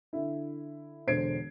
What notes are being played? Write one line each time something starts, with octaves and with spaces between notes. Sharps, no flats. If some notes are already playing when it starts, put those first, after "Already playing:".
D3 E4
E1 D3 C5 G#6 C7 D7